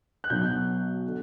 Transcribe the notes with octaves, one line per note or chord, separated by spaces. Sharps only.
F#6
B1 B2 F#3 B3 G6
D3